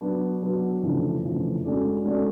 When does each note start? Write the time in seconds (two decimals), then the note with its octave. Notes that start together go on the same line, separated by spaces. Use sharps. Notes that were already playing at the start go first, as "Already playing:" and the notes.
0.01 F#3 B3 D4 F#4
0.42 F#3 B3 D4 F#4
0.83 F2 C#3 E3 A3 D4
1.24 F2 C#3 E3 A3 D4
1.64 G#3 C#4 F#4 A4 D5
2.05 G#3 C#4 F#4 A4 D5